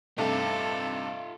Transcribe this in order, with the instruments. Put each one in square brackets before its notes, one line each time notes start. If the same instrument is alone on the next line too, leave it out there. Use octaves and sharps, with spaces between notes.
[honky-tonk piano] G2 C3 A3 [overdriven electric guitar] D#4 F4 [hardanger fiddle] A4